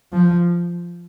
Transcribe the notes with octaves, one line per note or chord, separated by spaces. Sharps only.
F3